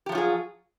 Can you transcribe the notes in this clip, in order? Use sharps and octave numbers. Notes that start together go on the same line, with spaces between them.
F3 F#3 F4 G4 G#4